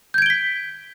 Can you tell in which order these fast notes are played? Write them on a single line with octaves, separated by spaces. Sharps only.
G6 G#6 D7 G7 B6